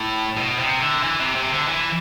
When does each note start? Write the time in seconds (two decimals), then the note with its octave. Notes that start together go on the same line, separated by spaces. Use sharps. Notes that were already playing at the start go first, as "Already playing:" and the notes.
Already playing: A2
0.37 B2
0.60 C3
0.81 D3
1.03 E3
1.20 C3
1.36 C3
1.52 D3
1.69 E3